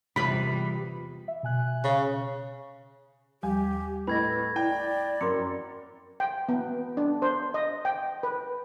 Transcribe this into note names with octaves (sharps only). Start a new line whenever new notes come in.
E2 C3 G3 F4 B4 B5
E5
B2 G#5 F#6
C#3
D#2 F3 G3 G4 G#5
A2 A4 B4 D#5 B5 G#6 A#6
E4 D5 G5
F#2 A#4 C6 D6 C#7
G5
B3
D4
C5
D#5
G5
B4